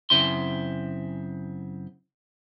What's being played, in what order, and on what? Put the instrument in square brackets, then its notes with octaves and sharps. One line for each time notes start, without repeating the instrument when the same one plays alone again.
[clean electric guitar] F#2 C#3 C4 E4 C6